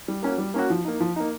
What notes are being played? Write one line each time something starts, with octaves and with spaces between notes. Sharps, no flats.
G3
A#3 C#4 F#4
G3
A#3 C#4 F#4
F3
A#3 D#4
F3
A#3 D#4